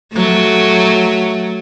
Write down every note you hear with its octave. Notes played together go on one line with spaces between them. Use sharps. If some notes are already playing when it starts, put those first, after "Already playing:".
F#3 A3